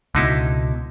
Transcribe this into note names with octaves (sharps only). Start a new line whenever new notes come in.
C#2 B2 D3 D#4 E4